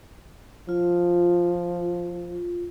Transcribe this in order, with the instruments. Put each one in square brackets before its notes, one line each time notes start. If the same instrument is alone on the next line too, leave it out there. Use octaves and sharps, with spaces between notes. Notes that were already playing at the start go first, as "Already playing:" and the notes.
[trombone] F3 [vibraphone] F4